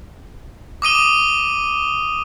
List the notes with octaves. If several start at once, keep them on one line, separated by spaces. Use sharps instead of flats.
D6 D#6 D#7 G7